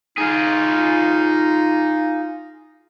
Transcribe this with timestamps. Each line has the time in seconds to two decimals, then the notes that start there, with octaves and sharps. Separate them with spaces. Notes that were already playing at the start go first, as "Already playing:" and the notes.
0.18 D#4 F4 G#4